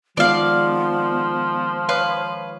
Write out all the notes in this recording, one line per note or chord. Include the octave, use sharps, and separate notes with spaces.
D#3 F3 G#3 B3 F4 D5 F5
B4 C#5 F5